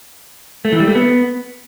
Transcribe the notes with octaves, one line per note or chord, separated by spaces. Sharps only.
A3
E3
G3
A3
B3